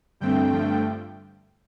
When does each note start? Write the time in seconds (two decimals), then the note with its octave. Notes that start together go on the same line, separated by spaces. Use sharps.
0.20 G2 D3 A3 C4 G5
0.51 G2 D3 F3 A3